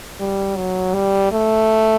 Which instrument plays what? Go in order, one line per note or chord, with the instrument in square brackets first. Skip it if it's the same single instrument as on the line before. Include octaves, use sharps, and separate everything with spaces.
[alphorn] G3
F#3
G3
A3